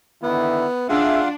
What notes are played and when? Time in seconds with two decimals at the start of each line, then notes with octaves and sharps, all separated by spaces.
0.23 D3 D#3 B3 E4
0.89 D4 F4 G#4 E5 F#5